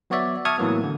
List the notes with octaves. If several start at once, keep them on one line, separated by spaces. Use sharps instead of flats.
F#3 B3 F#4 C#5 D5 E5
E5 A5 C#6 D#6 F6 G#6
A2 E3 F#3 A#3 B3
D3